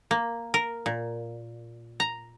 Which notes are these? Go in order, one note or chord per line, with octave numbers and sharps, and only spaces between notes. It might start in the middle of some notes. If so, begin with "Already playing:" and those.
A#3
A#4
A#2
A#5